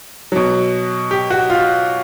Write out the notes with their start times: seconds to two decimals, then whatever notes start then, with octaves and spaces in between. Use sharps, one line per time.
0.32 B2 F#3
1.11 G4
1.30 F#4
1.50 F4